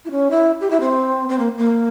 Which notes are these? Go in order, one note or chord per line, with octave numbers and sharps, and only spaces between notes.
E4
C#4
E4
G4
E4
C4
C4
A#3
A#3